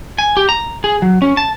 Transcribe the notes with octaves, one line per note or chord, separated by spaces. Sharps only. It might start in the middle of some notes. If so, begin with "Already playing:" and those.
G#5
G4
A#5
G#4
F#3
C#4
A5